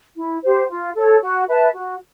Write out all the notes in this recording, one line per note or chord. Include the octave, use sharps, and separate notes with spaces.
E4
G4 C5
F4
A4 C#5
F#4
B4 E5 A5
F#4